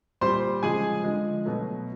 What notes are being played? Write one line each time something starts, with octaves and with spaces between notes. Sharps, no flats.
A#2 G3 C5 C6
C#3 F3 G#3 G#4 G#5
D3 F3 G#3
B2 F#3 A3